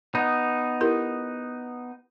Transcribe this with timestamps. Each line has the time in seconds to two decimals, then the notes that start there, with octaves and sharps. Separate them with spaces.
0.15 B3 D#4
0.81 E4 G4 A#4